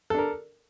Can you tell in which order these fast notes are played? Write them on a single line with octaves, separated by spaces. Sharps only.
A4 D4 A#4